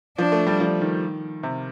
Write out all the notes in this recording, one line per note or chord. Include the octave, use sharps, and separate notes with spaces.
F3 D4
A3
G3
F3
D#3
C3